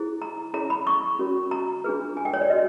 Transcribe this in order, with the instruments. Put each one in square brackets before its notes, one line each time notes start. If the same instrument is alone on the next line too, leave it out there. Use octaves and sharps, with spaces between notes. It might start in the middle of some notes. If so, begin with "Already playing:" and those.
Already playing: [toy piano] E4 G#4 C5
A#5
C#4 E4 G#4 C#5 A#5
B5
C#6
C#4 F#4 A#4 C#5
A#5
D4 F4 G#4 B4
G#5
G5
C#5
D5
F#4 B4 D#5